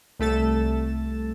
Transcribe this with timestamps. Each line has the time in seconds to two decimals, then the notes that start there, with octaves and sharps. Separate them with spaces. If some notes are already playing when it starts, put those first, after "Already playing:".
0.19 C2 A3 A4 A6 E7